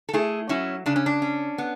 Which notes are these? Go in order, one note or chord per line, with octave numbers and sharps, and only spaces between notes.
A4
A3 E4 G#4
F#3 C#4 E4
C#3 D4
C#4
D4
C#4
B3